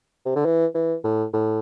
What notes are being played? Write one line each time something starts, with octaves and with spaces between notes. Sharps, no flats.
C3
D3
E3
E3
A2
A2